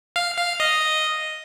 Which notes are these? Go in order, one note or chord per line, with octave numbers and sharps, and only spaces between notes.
F5
F5
D#5